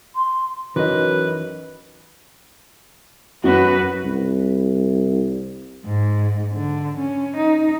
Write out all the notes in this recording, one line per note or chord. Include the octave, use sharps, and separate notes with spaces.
C6
F#2 E3 D#4 B4
F#2 F#4 B4
C2
G#2
D3
C#4
D#4